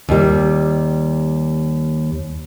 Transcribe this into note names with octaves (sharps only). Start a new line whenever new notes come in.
D#2 G3